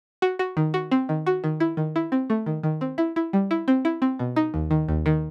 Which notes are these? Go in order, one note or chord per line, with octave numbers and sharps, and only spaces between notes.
F#4
F#4
D#3
F#4
C4
D#3
F#4
D#3
E4
D#3
E4
C4
A3
D#3
D#3
C4
E4
E4
G3
E4
C4
E4
C4
B2
D#4
D#2
D#3
D#2
D#3